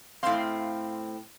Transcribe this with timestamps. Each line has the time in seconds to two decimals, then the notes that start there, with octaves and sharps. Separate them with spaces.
0.23 A2 C4 F5 C6